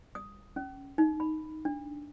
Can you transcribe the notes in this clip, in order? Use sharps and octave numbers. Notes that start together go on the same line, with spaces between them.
D#6
C#4
D#4
B5
D4